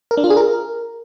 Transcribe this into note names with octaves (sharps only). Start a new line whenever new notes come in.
A#4
D4
F4
G#4
A#4